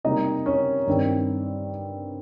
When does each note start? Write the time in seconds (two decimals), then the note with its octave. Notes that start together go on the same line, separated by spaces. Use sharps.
0.04 C3 G3 A#3 D#4 D#5
0.46 C#4 C#5
0.87 G2 D#3 G3 C4